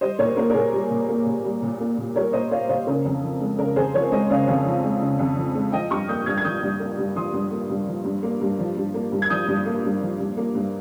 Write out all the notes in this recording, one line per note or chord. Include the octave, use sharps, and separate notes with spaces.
G3 C5 D#5
A#2 A#4 C#5
A#3 A#4
A#4
A#2 G#4
G3
A#2
A#3
A#2
G3
A#2
A#3
A#2
G3 A#4 C#5
A#2 C5 D#5
A#3 C#5 F5
A#2 C5 D#5
C#3 A#4
F2
F3
G#3
C#3 A#4
F2 G#4 C5
F3 A#4 C#5
G#3 C5 D#5
C#3 C#5 F5
F2
F3
G#3
C#3
F2
F3
G#3
F3 D#5 G5
G2 C#6 F6
A#3 D#6 G6
G2 F6 G#6
G#6
F3 D#6 G6
G2
A#3
G2
F3 C6 D#6
G2
A#3
G2
F3
G2
A#3
G2
F3
G2
A#3
G2
G#6
F3 D#6 G6
G2
A#3
G2
F3
G2
A#3
G2